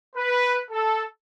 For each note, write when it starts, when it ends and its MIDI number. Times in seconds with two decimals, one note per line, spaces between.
0.15 0.59 71
0.71 1.03 69